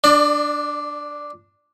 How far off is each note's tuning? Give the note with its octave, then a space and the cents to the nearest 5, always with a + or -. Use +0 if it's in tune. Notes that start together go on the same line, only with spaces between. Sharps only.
D4 +0 D5 +30